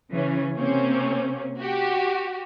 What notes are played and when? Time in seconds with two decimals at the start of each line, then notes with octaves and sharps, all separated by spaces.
0.11 C#3 E3 C#4
0.54 C3 A#3 C4 C#4
1.60 F#4 G4